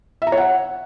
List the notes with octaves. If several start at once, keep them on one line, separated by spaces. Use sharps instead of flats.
E5
A#5
C#5
F#5